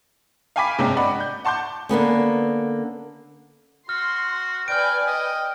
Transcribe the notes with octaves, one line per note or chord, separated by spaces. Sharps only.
F5 G5 G#5 B5 D6 B6
G1 G#2 C3 C#4 D4 G5
D5 D#5 F#5 B5
G6
F#5 A5 C6 D6 G6
D3 A#3 B3 C#4
F#4 C6 F6
B4 D5 G5 G#5 F6 D7
D#5 G5